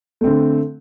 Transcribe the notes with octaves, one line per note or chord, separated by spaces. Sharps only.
D3 A3 C4